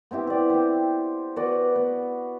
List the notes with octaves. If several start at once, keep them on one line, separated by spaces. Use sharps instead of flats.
B3 C4 E4 G4
G4 D5
C4 C5
B3 F#4 B4 D5
B3